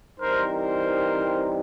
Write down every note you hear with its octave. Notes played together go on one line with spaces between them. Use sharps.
E3 G3 C4 D#4 A#4 C5
A#4 C5